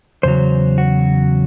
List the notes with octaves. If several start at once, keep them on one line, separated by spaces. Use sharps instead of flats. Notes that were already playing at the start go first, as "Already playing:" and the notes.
E2 C#3 F#3 C5
F#4